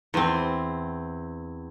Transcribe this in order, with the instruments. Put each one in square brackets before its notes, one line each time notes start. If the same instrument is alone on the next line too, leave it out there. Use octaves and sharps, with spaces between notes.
[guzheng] E2 C4